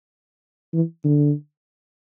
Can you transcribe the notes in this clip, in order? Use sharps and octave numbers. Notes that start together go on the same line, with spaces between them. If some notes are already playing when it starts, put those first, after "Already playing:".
E3
D3